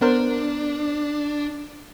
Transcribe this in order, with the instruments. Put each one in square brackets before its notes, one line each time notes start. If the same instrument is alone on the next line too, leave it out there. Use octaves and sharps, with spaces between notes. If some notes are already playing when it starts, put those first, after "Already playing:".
[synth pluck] B3 A#4 C5 [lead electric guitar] D4